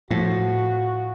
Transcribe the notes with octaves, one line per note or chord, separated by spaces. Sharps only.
A2 F3 F#4